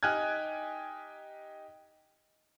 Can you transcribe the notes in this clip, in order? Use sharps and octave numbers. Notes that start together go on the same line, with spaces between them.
D#4 G4 G#5 F6 F#6 G#6